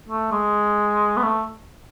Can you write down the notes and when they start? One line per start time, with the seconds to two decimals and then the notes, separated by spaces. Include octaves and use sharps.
0.08 A3
0.32 G#3
1.17 B3
1.23 A3